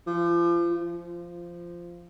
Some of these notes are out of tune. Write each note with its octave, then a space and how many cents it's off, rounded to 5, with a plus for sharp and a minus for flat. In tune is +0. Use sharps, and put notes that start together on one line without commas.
F3 -30
F3 -10